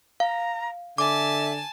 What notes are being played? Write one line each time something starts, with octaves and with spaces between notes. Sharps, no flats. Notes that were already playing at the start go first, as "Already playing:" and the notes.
F5 A#5
D3 E5 G#5 A5 D6